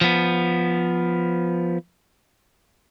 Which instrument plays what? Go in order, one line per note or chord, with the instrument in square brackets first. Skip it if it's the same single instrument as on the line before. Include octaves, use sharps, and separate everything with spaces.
[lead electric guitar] F3 B3